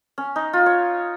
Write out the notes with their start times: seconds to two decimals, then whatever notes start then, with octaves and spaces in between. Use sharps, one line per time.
0.18 C#4
0.36 D#4
0.53 F4
0.66 C#5